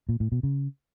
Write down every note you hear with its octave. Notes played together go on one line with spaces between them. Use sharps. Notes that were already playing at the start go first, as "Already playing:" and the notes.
A#2
A2
B2
C#3